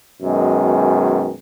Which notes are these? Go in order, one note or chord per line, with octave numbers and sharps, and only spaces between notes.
F#2 B2 D#3 G#3